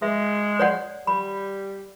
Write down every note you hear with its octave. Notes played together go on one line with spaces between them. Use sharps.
G#3 E5
C#5 D5 F#5
G3 B5